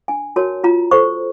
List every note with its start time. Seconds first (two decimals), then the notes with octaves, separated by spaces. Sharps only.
0.08 D4 G#5
0.36 F#4 A#4 C#5 A5
0.64 F4 A#5
0.91 A4 C5 C#6